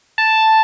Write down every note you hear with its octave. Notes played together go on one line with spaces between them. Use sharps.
A5